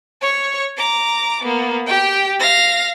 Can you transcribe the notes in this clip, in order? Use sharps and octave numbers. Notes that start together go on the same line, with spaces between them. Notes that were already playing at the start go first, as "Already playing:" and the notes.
C#5 C#6
A#5 D6
A#3 B3
G4 G5
F5 A#6